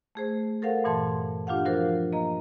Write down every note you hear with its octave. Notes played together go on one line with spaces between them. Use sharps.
A3 G#4 C5
A4 A#4 C5 F5 F#5
G2 A#2 E3 A5 C6
D4 F4 G4 F5 F#5
F3 F#4 A#4 C5
A#3 D#5 A#5